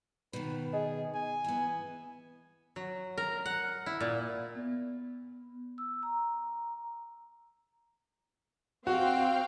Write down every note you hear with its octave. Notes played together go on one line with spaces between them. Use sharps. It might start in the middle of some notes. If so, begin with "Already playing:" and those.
B2 D#3 B4
G#4 D#5
G#5
E3 B3
F#3
A#4
F#5
E4
A#2
B3
E6
A#5
C4 F#4 F5 G5